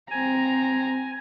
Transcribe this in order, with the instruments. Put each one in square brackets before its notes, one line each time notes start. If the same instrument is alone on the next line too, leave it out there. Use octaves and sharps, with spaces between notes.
[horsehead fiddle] C4 A#5 [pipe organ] G#5